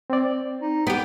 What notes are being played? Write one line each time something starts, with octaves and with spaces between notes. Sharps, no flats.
C4 D5
D#4
B3 G4 G5